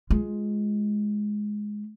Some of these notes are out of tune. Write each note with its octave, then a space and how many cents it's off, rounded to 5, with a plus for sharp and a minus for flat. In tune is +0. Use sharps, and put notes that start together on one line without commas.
G#3 +5 F4 +0